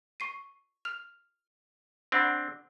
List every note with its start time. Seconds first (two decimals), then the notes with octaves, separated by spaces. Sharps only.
0.20 C#6 C7 D#7
0.85 F6 F7
2.12 C4 D4 C5 F#5 B5